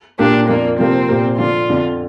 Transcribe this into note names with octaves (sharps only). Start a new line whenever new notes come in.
A#2 A#3 D4 G4 A#4
F2 F3 A#3 D4 A#4
C3 F3 A#3 C4 G4 A#4
A#2 A#3 G4 A#4
D3 F3 D4 F4
F2 D3 F3